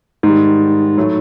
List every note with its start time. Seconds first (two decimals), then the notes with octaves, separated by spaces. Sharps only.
0.23 G#2 D#3 G3 D#4
0.97 A2 F#3 A3